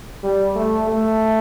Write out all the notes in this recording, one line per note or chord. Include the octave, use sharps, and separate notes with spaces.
G3
A3
A3